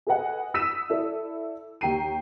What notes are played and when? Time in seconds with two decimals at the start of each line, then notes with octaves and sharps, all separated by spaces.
0.07 G#4 A4 B4 D#5 F#5 G#5
0.54 D#6 E6 B6 D#7 E7
0.90 E4 A4 D5
1.81 D#2 G4 G5 A#5 C7 D#7